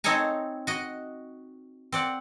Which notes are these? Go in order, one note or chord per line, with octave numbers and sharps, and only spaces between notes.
C4 D#4 A4 C#5 G#5 A#5
F#4 D#5
C4 D5 F#5